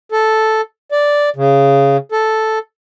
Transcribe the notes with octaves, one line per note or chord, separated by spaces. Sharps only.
A4
D5
C#3
A4